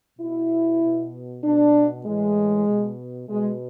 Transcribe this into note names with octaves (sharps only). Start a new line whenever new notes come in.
B2 E4
B2
B2 D4
A2 E3 G#3
B2
B2 G#3